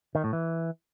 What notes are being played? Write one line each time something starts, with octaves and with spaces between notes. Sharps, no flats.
D#3
A2
E3